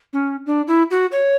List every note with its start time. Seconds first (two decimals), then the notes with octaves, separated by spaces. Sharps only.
0.13 C#4
0.46 D4
0.68 E4
0.91 F#4
1.12 C#5